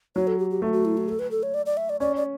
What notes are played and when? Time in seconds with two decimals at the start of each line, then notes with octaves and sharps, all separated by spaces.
0.16 F#3 C#5
0.27 A4
0.39 G4
0.50 G4
0.62 A3 F#4
0.73 F#4
0.85 E4
0.97 F#4
1.09 A4
1.19 B4
1.31 A4
1.43 C#5
1.54 D5
1.66 D5
1.77 E5
1.89 D5
2.00 C#4 D5
2.16 D5